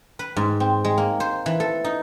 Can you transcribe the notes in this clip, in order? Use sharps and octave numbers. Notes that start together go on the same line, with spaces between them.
B4
G#2
C4
G#3
A#3
C5
E3
A4
D#4